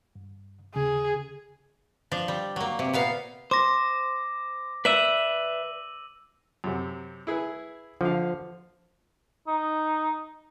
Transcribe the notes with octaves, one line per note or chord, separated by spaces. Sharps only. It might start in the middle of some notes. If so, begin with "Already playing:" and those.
G2
D#2 C#3 G#4
F3 D4
G3
F#3 A#3
C3
A#2 B3 F5
C5 D6 A#6
B4 D5 E5 E6 D#7 F#7
F#2 C3
E4 G#4 B4
D3 F3 F5
D#4